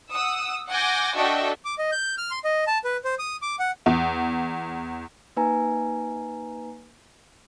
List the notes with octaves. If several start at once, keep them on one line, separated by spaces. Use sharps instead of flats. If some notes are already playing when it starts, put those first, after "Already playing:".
F#5 D#6 E6
F#5 G#5 D6 G6 A#6
D4 F#4 A4 D#5 E5 G5
D6
D#5
G6
F6
C6
D#5
A5
B4
C5
D#6
D6
F#5
E2
A#3 D#4 B4 G#5 A#5